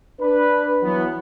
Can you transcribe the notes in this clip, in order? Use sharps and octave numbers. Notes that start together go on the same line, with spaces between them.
D4 B4
E3 F#3 B3